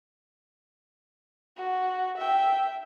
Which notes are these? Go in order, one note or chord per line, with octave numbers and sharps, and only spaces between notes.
F#4
E5 G5